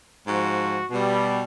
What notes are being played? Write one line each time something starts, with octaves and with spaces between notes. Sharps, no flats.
G#2 F3 F#4
B2 G3